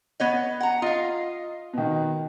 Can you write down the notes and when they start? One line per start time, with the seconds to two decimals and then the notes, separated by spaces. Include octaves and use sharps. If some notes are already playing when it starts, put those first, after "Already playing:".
0.20 B3 C#5 D#5
0.60 F#5 A#5
0.82 F4 D#5 F5
1.73 B2 D#3